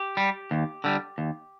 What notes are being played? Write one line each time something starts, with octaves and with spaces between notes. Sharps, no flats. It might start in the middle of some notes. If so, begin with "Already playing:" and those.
Already playing: G4
G3
D#2
D3 G3
D#2